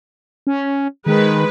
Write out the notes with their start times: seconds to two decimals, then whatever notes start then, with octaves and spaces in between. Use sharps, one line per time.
0.47 C#4
1.07 D#3 G#3 B4